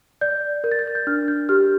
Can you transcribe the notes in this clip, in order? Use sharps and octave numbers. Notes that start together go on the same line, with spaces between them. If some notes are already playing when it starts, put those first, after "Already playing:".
D5 G6
A#4 G6
A6
G6
A6
G6
D4 F6
G6
G4 F6